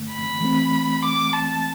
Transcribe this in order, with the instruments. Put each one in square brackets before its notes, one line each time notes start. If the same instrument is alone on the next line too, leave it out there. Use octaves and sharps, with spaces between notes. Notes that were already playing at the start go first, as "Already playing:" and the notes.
Already playing: [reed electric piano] G2 D3 A3
[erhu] B5
[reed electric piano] E3 A3 C4
[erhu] D6
A5